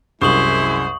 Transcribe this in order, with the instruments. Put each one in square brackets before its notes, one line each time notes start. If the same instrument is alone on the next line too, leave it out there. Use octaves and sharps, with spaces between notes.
[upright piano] C2 F#2 [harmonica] G#3 E4 [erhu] C5 [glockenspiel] C#6 D#6 F#7